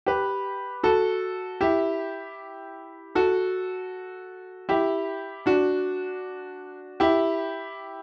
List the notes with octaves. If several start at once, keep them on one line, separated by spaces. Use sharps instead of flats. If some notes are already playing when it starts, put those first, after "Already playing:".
G4 B4
F#4 A4
E4 G4
F#4 A4
E4 G4
D4 F#4
E4 G4